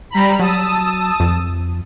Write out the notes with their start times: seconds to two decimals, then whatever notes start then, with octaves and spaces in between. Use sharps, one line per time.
0.10 G3 A#5 B5
0.40 F#3 A5 D#6 E6
1.20 F2